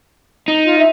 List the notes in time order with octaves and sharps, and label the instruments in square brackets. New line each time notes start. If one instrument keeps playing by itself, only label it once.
[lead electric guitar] D#4
[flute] F4
E5